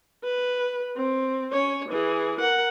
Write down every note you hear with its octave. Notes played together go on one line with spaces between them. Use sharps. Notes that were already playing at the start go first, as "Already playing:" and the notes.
B4
C4
C#4 C#5
E3 G#4
A#4 F#5